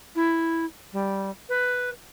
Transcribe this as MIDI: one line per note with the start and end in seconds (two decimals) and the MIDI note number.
0.15 0.65 64
0.93 1.30 55
1.49 1.90 71